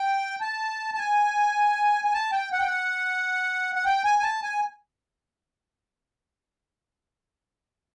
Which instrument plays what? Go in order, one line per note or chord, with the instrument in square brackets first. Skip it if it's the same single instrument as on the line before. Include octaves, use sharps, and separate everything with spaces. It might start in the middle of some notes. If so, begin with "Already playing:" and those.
Already playing: [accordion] G5
A5
A5
G#5
G#5
A5
G5
F#5
G5
F#5
F#5
G5
G#5
G#5
A5
G#5